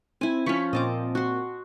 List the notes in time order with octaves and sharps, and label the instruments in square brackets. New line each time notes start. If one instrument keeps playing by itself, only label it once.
[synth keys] C4 [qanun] E4 G#5
[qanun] F3 C#4 [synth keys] C#6 B6
[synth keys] A#2 C4 [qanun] D#5 A5 D6
[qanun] F#4 C6